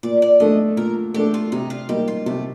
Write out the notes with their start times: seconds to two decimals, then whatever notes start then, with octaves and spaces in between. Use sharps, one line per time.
0.03 A#2 D5
0.22 D5
0.40 A3 D4 A4 D#5
0.77 A#2 A#4
1.14 A3 D4 G4 A4
1.34 F4
1.52 C3 D#4
1.70 F4
1.89 G3 A#3 D#4 G4
2.08 F4
2.26 C3 A3